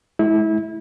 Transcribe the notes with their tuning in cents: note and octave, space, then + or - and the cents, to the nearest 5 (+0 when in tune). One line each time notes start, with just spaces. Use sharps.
G#3 +40 E4 -25